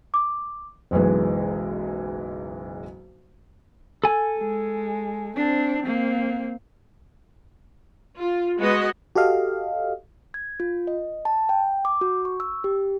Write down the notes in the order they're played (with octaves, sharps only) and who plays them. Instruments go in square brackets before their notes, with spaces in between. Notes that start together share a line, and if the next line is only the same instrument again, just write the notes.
[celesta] D6
[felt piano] F#1 B1 E3 G#3
[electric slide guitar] A4 G#5
[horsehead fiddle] G#3
C4 D4
A#3 C4
[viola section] F4
G#3 B3 F#4 D#5
[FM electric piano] F#4 G4 A4 D#5 F5
[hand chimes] G#6
F4
D#5
A5
G5
D6
F#4
C#6
E6
G4